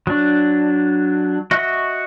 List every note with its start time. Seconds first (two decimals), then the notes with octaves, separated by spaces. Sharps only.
0.07 F#3 D4
1.51 F#4 D#5 E5 C#6 F#6